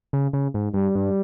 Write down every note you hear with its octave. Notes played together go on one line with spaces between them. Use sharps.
C#3
C#3
G#2
G2 G3
G2